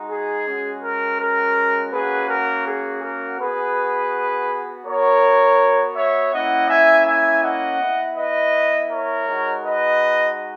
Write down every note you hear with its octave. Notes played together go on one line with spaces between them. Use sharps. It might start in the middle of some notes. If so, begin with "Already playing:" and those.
Already playing: G#3 D#4 F#4
G#4
G#3 C#4 F#4
A#4
A#4
A#3 C#4 F#4 G#4 B4
A#4
G#4
A#4
B3 F#4 G#4 B4
B3 F#4 A#4 C#5
C#5 E5
A#3 C#4 E4 D#5 F#5
E5 G#5
E5 G#5
D#5 F#5
B3 E4
B4 D#5
A#4 C#5
G#3 D#4 F#4
B4 D#5